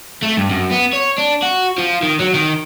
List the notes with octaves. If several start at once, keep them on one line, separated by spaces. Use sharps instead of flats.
A3
G2
F#2
B3
C#5
D4
F#4
F3
D#3
F#3
D#3